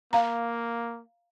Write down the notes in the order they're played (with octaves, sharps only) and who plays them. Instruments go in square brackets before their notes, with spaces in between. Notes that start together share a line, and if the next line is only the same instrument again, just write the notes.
[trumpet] A#3 [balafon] F5 A#5